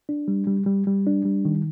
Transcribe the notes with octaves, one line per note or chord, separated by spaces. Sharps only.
D4
G3
G3
G3
G3
D4
G3
D#3